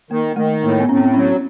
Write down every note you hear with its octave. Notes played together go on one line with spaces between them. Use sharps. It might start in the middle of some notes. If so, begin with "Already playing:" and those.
D#3 A#3
D#3 A3
A2 A#3
B3
A2 C#4
C4
F#3 C#4